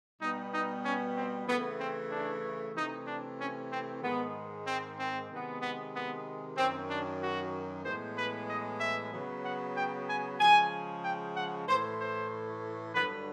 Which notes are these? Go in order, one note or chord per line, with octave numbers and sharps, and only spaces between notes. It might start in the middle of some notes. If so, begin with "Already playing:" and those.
B2 G3 B3 D#4
D#4
C#4
C4
C#3 E3 A3 B3
C4
D4
C3 E3 A3 D#4
D4
C#4
C4
G#2 D#3 G#3 B3
C4
C4
C3 D#3 G#3 B3
B3
B3
F#2 D#3 F#3 C4
D4
F#4
A2 E3 G#3 B3 C5
B4
D#5
E5
C#3 F#3 B3
F#5
G5
G#5
C#3 F3 G#3 G#5
G5
F#5
A2 E3 A3 C5
C5
G2 D3 F#3 B4